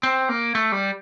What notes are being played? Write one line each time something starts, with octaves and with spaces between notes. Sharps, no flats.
C4
A#3
A3
G3